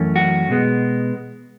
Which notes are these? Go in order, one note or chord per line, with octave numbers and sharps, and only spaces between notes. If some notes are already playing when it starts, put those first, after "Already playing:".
Already playing: F#2 E3 A3 C#4
F#4
B2 G#3 B3